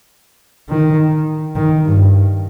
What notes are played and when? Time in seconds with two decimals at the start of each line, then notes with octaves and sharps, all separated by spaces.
0.69 D#3
1.56 D#3
1.85 G2